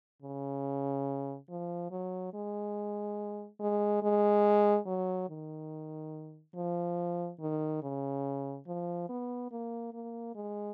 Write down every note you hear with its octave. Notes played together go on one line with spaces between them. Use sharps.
C#3
F3
F#3
G#3
G#3
G#3
F#3
D#3
F3
D#3
C#3
F3
B3
A#3
A#3
G#3